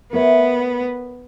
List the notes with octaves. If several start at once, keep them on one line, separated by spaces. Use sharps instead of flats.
B3 A#4 C#5 E5